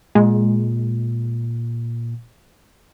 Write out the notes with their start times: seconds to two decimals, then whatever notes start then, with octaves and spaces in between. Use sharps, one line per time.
0.15 A#2 G#3